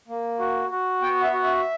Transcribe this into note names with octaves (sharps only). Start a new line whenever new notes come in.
A#3
F#4
F#4
B3 G5
E5
F#4
E5